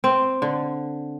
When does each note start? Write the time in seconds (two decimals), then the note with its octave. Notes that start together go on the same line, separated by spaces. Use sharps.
0.04 C4
0.42 D3